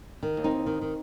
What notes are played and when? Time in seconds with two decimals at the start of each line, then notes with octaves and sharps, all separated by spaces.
0.23 D#3
0.37 D#2
0.44 C4 D#4
0.51 D#2
0.66 D#3
0.82 D#3